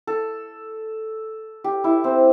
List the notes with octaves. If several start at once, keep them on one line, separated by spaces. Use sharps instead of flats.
A4
G4
E4
C4